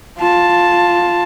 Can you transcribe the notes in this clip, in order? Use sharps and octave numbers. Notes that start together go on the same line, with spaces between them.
F4 A5